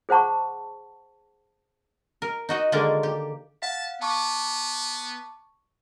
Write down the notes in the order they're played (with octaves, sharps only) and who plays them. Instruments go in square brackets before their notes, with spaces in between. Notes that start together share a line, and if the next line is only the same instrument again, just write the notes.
[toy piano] G#4 C5 F#5 A5 C#6
[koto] A#4
D#4 F#4 D#5
D3 D#3 G#3 A#3 D4 A#4
G4
[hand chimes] F5 F#5 B6 [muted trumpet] A5
[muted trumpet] B3 [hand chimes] A5 C#6 D6